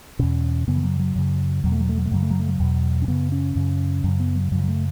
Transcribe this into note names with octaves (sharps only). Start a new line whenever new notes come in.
E2 B2 C#4
F#2 C#3 B3
E3
F#3
F#3
F#2 C#3
E2 B2 F#3
A3
F#3
A3
F#3
A3
F#2 C#3 F#3
A3
F#3
A3
F#3
E2 B2
C#4
F#2 C#3 B3
C#4
F#2 C#3
F#2 C#3 F#3
B3
F#3
F#2 C#3 F#3
F#3
A3